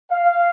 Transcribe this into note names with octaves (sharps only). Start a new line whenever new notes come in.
F5